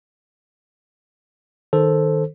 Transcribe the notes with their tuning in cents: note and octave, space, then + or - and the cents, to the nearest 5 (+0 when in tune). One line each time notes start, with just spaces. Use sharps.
D#3 +0 A4 +0 C5 +0